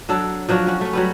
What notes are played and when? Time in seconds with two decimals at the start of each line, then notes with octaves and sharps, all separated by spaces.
0.09 F#3 D4 A4
0.49 F3 F#3 D4 F#4
0.67 C#4 F#4
0.81 A3 C#4
0.93 F#3 G3 B3